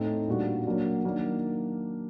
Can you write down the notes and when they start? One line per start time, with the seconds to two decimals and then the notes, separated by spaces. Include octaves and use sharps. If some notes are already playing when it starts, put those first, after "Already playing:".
Already playing: A2 A3 C4 D#4
0.28 A#2 G3 D4 F#4
0.66 F#3 A#3 D4 F#4
1.04 D#3 F#3 A#3 D4